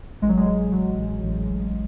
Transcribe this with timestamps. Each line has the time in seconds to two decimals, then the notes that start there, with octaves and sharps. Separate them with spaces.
0.22 A1 G#3
0.29 F#3
0.37 G#3
0.47 F#3
0.72 F#3
0.97 A1
1.23 A1
1.47 A1